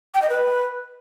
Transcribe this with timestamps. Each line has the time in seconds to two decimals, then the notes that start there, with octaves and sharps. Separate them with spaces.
0.14 G5
0.22 D#5
0.30 B4